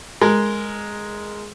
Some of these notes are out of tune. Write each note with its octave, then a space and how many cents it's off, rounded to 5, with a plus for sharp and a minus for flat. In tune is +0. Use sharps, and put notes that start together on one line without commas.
G#3 +0 A#4 +0